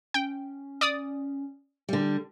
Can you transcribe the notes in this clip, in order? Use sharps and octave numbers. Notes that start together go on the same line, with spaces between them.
C#4 G5
D5 D#6
D3 G3